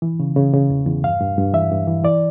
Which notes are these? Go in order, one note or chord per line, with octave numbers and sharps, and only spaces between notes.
E3
C#3
C#3
C#3
E2
E2
G2 F5
G2
G2
E3 E5
G2
E3
E3 D5